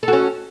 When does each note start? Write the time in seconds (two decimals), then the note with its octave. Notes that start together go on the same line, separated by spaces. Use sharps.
0.03 A4
0.08 F#4
0.13 C#4